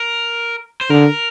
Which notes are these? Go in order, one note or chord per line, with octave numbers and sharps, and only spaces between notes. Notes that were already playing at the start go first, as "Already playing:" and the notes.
Already playing: A#4
C5
D3 A#4